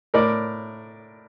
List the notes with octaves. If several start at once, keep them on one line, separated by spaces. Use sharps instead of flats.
A2 A#4 D5